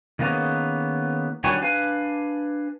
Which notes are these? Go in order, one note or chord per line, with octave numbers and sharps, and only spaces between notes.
D#3 A#3 B3 C#4 G#4
D#3 G3 D4 F#4 C#5 G#5
D4 B4 F5 G#5